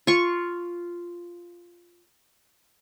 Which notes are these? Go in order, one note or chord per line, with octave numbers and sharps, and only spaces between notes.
F4 C#6